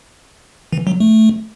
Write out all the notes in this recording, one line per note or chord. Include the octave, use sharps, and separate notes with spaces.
E3
F#3
A3